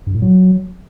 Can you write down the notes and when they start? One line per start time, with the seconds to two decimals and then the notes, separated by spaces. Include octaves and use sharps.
0.07 G2
0.14 A2
0.22 F#3